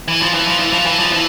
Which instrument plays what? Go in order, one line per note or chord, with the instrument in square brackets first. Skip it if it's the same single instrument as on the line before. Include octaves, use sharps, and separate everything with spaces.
[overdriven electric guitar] E3
F3
E3
F3
E3
F3
E3
F3
E3